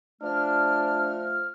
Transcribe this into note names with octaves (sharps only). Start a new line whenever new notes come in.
F3 A3 D4 F6